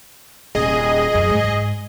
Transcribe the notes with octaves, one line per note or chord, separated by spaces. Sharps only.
D#1 G#4 D#5
F#2
G#2